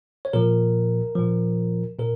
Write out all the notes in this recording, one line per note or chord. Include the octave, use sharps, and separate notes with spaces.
C#5
A#2 F3 A#4
A#2 F3
A#2 A#4